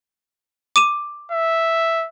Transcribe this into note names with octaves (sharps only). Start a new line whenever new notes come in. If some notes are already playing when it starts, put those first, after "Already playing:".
D6 D#7 E7
E5